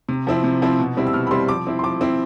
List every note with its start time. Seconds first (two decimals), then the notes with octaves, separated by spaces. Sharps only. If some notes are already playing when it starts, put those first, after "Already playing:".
0.09 C3
0.27 F3 C4 E4
0.44 C3
0.62 F3 C4 E4
0.80 B2
0.97 G3 C4 E4
1.07 E6
1.13 B2 F6
1.27 B5
1.31 G3 C4 E4 C6
1.48 F3 D6
1.67 C4 E4
1.79 C6
1.83 F3 D6
2.01 C4 E4